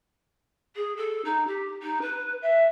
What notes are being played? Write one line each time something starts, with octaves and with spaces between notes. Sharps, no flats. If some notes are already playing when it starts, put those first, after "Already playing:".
G#4
A4
D#4
G4
D#4
B4
E5